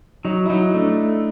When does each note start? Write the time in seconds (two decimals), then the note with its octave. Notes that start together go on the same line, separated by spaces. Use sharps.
0.24 F#3 D#4
0.46 E4
0.50 F#3 D#4
0.74 A3 D4